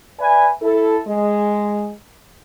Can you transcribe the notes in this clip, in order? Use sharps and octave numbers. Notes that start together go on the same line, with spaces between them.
B4 D5 E5 G#5
E4 A4
G#3